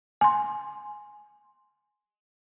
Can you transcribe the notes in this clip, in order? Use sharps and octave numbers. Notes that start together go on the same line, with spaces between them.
G#5 C6